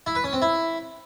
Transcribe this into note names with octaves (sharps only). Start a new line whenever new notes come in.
E4
B4
C#4
C4
E4